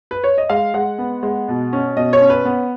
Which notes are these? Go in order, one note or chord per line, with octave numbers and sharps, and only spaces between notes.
B4
C#5
D#5
G#3 F5
G#3 F#5
B3
G#3
B2
C#4
B2 D#5
C#5
C#4
B4
B3